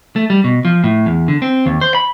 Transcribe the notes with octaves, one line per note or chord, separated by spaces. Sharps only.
A3
G3
B2
F3
A2
E2
D3
C4
D#2
C5
B5